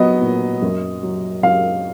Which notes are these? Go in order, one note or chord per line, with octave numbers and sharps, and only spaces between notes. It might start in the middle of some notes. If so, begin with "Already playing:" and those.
Already playing: F#3 B3 D#5
A#2
F#2
F#3
F#2 F5